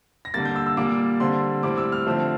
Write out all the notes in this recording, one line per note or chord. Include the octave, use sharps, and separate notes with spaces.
A#6
D3 G3 A#3 A6
G6
E6
E6
A#2 G3 A#3 D6
D3 G3 C4 C6
A2 G3 C4 D6
E6
F6
D3 F3 A3 C4